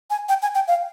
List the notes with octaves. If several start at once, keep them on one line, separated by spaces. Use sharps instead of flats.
G#5
G5
G#5
G5
F5